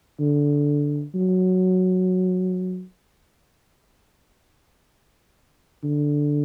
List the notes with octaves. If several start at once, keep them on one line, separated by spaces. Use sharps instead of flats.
D3
F#3
D3